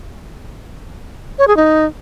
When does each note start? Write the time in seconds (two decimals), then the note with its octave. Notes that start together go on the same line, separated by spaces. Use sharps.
1.38 C#5
1.48 G#4
1.57 D#4